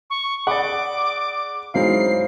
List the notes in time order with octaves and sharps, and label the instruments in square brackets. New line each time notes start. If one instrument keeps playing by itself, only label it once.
[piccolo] C#6
[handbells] G#4 D5 [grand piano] F#5 B5 [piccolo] D6
[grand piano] G#2 F#3 E4 [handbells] G#4 C5 F5 [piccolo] C7